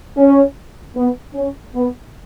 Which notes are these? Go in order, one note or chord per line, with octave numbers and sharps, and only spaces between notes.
C#4
B3
C#4
B3